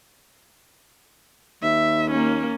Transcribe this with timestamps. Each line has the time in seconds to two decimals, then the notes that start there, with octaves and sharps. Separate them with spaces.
1.62 D#2 E5
2.11 A#3 C#4